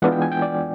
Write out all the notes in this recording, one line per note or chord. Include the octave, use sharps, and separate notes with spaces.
E3 G#3 B3 D4 F4 F#5
G5
G#5
G5
D5